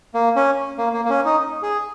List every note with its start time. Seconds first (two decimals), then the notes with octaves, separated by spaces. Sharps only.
0.14 A#3
0.36 C#4
0.78 A#3
0.93 A#3
1.05 A#3
1.10 C#4
1.25 D#4
1.62 G#4